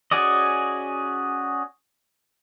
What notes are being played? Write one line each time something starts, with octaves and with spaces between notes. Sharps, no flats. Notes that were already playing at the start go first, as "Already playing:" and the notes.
C#4 F#4 G#4 D5 D#5